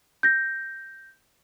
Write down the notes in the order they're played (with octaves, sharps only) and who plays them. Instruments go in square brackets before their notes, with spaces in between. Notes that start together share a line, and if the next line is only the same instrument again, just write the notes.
[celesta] G6 A#6